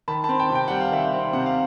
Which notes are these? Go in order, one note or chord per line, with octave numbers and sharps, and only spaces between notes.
D#3 A5 B5
A5 B5
C4
G5 A5
C3
G5
G3 F#5
F5
D#3 E5 F#5
C4
C3 F#5
F5